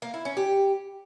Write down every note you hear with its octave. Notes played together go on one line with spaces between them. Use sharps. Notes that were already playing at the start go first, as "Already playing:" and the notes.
A#3
E4
C#4
G4